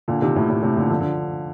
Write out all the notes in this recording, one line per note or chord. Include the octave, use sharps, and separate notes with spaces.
A#2 D3
C3 D#3
A2 C3
A2 C3
A2 C3
A#2 D3
D3 F3
D3 F3